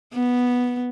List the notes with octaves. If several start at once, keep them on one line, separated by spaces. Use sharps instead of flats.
B3